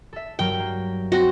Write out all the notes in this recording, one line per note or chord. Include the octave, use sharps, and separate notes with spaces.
A4 E5
G2 F#3 A#4 G5
A#3
C4 F#4 A#6